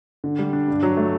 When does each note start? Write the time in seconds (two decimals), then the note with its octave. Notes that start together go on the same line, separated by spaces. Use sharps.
0.24 D3
0.39 G3
0.53 D4
0.68 G2
0.83 F#3
0.97 A3